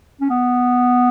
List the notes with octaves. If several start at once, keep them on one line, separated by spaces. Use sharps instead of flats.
C#4
B3